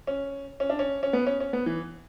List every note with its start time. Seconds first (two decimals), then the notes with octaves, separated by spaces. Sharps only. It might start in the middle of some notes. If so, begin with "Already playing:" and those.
0.07 C#4
0.60 C#4
0.70 D4
0.79 C#4
1.03 C#4
1.13 B3
1.27 C#4
1.40 C#4
1.53 B3
1.66 E3